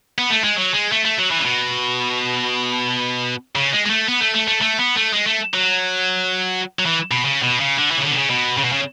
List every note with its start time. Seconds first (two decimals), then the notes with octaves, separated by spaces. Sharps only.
0.19 B3
0.30 A3
0.44 G#3
0.56 F#3
0.73 G#3
0.92 A3
1.05 A3
1.18 F#3
1.31 E3
1.39 C#3
1.43 B2
3.56 C#3
3.73 G#3
3.85 G#3
3.90 A3
4.08 B3
4.21 A3
4.35 A3
4.48 A3
4.61 A3
4.78 B3
4.96 A3
5.13 G#3
5.26 A3
5.54 F#3
6.79 F#3
6.86 E3
7.11 B2
7.25 C#3
7.43 B2
7.60 C#3
7.78 D3
7.91 E3
7.98 C#3
8.03 D3
8.12 B2
8.17 C#3
8.30 B2
8.57 C#3
8.64 B2
8.72 C#3